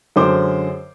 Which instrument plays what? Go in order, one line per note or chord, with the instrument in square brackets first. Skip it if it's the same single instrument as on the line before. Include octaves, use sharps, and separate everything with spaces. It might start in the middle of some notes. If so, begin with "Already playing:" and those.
[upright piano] F#2 D3 G#3 C5 D6